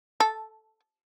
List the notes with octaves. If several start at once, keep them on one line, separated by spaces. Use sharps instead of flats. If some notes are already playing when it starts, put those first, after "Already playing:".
A4